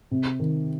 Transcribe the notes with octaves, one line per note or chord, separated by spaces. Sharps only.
C3
D#3